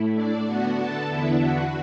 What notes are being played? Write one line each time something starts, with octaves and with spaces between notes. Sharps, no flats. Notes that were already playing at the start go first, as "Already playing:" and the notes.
Already playing: A2 A3 E4
D4 D5
D3 B3 D4 F#4 F#5
A4 A5
E2 D3 B3 D4 E4 E5
F#4 F#5